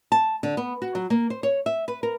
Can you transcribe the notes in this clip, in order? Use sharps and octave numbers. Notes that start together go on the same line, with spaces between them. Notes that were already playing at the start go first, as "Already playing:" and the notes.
A5
D3
B3
F#4
F#3
A#3
C5
C#5
E5
B4
A#4